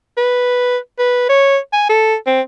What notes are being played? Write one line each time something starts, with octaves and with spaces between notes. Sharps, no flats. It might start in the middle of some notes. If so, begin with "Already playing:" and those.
B4
B4
C#5
G#5
A4
C4